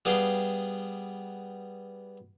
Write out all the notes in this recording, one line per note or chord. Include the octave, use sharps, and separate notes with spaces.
G3 B3 G#4 F5 G5